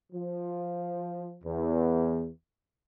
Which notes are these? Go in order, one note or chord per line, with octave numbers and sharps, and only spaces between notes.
F3
E2